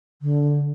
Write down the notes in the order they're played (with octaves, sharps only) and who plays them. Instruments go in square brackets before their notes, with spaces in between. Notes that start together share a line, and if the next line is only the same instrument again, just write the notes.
[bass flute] D3